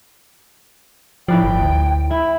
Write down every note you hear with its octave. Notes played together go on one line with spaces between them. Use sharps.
A2 F3 B4 D5 G5
G1
D2
E4 B5